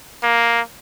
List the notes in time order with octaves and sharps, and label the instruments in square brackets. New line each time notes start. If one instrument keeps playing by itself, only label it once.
[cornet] A#3